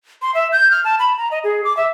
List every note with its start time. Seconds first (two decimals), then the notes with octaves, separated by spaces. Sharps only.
0.22 C6
0.34 E5
0.52 G6
0.71 F6
0.84 A5
0.99 B5
1.18 A#5
1.31 D#5
1.44 G#4
1.64 D6
1.77 E5